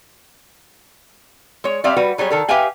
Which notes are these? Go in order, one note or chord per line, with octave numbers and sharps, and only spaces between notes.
G#3 C#5
G3 C4 D5 E5 F5
G3 F#4 B4
F#3 G3 G#4 C#5
D#3 A4 A#4
G4 B4 E5 F5 G5 G#5